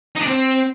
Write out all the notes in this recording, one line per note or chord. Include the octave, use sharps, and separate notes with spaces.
D#4
D4
C4